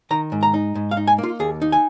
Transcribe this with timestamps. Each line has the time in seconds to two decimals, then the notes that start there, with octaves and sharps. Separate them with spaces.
0.11 D#3 A#5
0.32 G#2
0.43 A#5
0.54 D#4
0.75 G#2
0.91 F5
0.97 D#4
1.07 G#5
1.18 A#3
1.23 F4
1.40 D#2 G#4
1.62 D#4
1.72 G#5